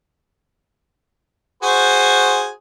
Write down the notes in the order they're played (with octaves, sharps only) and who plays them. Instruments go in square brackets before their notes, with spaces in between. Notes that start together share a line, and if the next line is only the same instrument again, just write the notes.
[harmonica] F#4 G#4 C5